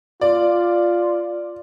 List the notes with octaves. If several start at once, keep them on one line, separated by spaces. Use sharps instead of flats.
F4 D5